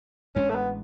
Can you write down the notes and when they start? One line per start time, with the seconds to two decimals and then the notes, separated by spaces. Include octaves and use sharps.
0.36 A1 A2 G#3 C#4 D4
0.50 A3
0.56 B3